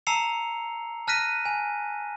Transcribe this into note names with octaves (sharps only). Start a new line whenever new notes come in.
A5 A#5 E6 C7 C#7 F7
A5 F6 F#6 A#6 B6 D#7
G#5